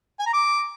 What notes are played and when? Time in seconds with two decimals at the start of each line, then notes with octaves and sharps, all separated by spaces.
0.20 G#5
0.26 A#5
0.33 D6